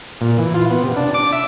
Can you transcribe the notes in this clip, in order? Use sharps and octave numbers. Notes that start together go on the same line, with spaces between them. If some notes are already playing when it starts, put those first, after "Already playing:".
A#2
E3
F4
B3
C3
D4
D6
E5